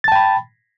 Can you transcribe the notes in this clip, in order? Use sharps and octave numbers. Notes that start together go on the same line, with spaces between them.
G5 A5 B5 A6